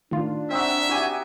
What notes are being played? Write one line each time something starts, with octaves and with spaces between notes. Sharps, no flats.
A2 D#3 D4 F4
C4 D#4 F#4 E5
E4 F#4 G4 G#5